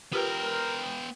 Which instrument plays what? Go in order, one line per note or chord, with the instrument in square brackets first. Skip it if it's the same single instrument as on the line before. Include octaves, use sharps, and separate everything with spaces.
[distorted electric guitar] B3 G5 [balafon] F4 G4 B4 [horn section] A#4